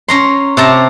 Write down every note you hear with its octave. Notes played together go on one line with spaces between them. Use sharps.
C#4 A#5 C6
C3 A5 A#5